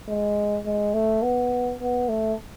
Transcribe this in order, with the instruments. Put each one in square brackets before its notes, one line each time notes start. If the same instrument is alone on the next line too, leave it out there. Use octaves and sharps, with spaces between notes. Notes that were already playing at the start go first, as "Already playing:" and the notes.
[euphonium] G#3
G#3
A3
B3
B3
A3